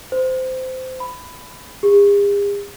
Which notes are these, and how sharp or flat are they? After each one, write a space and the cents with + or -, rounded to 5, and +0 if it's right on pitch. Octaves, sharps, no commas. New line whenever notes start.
C5 -20
B5 +15
G#4 -45